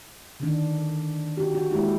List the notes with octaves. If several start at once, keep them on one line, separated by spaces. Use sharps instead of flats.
D3 D#3 D4
F#4 G4
F#4
G#3 A#3 E4 G4